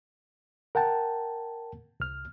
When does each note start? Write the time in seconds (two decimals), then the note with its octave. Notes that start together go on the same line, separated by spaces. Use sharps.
0.75 A#4 F#5 G5 A5
2.00 C2 F6